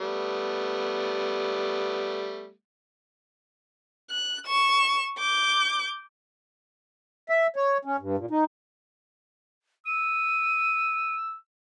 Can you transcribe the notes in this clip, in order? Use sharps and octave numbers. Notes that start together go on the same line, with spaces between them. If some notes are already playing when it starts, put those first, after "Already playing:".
G3 A3 B3
F#6
C#6 E7
D6 G6
E5
C#5
C#4
G2
A#2
D#4
E6 D#7